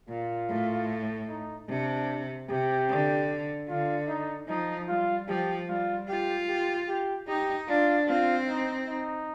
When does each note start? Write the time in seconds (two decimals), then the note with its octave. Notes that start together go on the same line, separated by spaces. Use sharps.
0.09 A#2 F4
0.49 A2
1.29 D#4
1.69 C3 D4
2.49 C3 G4
2.89 D3
3.69 D3 F4
4.08 D#4
4.48 F3 D#4
4.88 G3 F4
5.28 F3 G4
5.68 G3 F4
6.09 F4 G4
6.48 G4
6.88 G4
7.28 D#4 G4
7.68 D4 F4
8.08 C4 F4
8.48 D#4
8.88 D#4